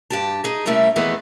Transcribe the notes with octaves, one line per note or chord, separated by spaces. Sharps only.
G2 G4 A5
D#4 G#4
C3 G3 A3 C#4 E4 A#4
F2 D#3 E3 G#3 A3 B3